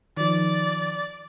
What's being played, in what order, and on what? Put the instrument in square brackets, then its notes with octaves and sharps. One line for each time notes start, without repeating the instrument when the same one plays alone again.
[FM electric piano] D#3 F3 [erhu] D5